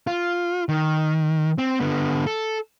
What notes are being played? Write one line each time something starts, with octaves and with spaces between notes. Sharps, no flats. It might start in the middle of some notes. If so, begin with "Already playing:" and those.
F4
D#3
C4
D3 B3
A4